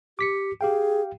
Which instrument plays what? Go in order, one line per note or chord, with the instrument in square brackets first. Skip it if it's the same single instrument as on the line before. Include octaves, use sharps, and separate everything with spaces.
[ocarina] G4 [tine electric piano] D6 B6 C#7
[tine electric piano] G4 F5 G5 [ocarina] G#4